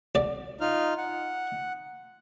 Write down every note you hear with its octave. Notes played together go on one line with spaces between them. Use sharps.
B1 D5
D#4 F4 F6
F#5